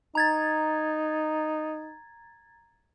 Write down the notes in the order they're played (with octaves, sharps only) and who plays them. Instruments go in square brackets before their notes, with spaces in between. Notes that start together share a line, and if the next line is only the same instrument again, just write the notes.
[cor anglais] D#4 [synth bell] A#5 G#6 A6